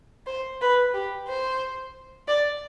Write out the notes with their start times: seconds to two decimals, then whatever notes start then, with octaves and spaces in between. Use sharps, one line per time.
0.27 C5
0.61 B4
0.94 G4
1.28 C5
2.28 D5